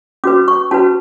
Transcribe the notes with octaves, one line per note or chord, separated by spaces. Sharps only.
C#4 F#4 B4 D6
C#6
C#4 F#4 B4 A5